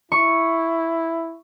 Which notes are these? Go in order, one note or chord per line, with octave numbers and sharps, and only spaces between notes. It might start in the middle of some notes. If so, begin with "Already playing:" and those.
E4 C#6